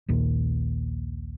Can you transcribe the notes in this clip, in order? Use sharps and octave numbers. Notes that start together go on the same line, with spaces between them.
A#1 D#2 A#2